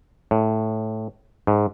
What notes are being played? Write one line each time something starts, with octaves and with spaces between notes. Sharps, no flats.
A2
G#2